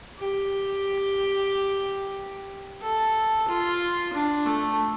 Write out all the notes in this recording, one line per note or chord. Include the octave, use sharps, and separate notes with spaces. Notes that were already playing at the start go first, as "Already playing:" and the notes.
G4
A4
F4
D4
A3